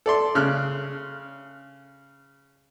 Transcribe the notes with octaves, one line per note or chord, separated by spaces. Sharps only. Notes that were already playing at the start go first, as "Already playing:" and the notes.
A4 D5 C6
C#3 F6 F#6